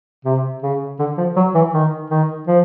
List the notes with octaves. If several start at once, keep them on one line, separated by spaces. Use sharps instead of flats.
C3
C#3
D3
F3
F#3
E3
D#3
D#3
F3